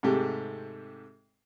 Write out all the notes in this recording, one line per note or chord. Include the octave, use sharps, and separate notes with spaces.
G#2 C3 A3 G4